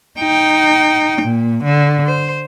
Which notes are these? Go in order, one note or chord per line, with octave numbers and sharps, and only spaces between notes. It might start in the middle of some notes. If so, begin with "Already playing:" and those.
D#4 G5
A#2
D3
C5